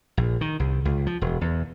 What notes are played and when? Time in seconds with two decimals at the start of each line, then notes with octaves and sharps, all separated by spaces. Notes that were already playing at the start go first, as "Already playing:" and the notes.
0.17 A#1
0.41 D#3
0.60 C2
0.85 C#2
1.07 F3
1.21 E1
1.41 E2